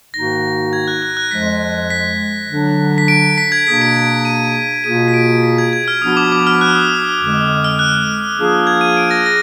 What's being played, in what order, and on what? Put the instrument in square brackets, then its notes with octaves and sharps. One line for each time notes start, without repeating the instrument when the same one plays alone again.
[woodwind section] G#2 D#3 A#3 D#4 F#4 [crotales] A#6
[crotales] G#6
F#6
F#6
F#6
[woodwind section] F2 F3 G#3 [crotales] B6
[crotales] B6
[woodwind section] D3 F#3 D4
[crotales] B6
D7
B6
G#6
[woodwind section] B2 A#3 D4 G#4 [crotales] B6
[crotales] D7
D7
D#7
[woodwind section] B2 A#3 F4 G#4 [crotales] D#7
[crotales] B6
D7
B6
G#6
G#6
F6
[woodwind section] F3 B3 D4 F#4 [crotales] D#6
[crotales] D6
D6
F6
F#6
D#6
[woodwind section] F2 D3 G#3
[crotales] F6
F#6
[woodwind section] F3 A#3 D4 F4 G#4
[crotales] G#6
D#7
D7
A#6
A#6